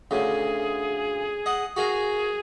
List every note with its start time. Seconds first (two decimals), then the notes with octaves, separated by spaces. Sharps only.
0.11 D2 C#3 G#4
1.46 D#5 F#5
1.76 F#4 G#4 A#4 F5